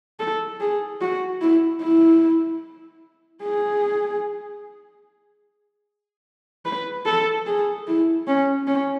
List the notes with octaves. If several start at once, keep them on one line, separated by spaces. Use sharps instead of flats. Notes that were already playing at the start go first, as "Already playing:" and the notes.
A4
G#4
F#4
E4
E4
G#4
B4
A4
G#4
E4
C#4
C#4